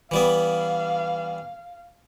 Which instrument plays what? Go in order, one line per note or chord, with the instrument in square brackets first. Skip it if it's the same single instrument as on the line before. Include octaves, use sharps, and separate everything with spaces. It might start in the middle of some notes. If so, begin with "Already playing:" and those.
[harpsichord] E3 G3 B3 [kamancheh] F5